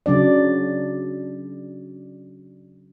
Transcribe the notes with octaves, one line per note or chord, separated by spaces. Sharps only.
C#3 F#3 D4 D5